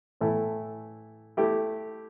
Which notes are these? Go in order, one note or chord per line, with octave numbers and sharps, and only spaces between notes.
A2 E3 A3 E4
A3 E4 G4